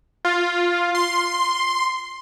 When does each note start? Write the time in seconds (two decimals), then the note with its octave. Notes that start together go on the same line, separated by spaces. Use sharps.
0.25 F4
0.95 C6